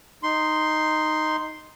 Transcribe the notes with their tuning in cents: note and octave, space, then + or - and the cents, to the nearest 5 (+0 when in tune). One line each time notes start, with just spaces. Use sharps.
D#4 +0 C6 +0